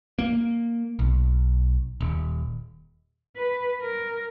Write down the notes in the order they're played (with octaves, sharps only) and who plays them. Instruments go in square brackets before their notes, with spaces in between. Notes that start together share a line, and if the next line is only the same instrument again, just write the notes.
[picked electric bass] A#3
B1
D#1
[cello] B4
A#4